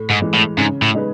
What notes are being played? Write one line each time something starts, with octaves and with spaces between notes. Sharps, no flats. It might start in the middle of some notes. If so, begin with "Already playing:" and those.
Already playing: A2
G#2
E3 G#3
A2
G#2 C#3
A2
G#3 D#4 G#4 B4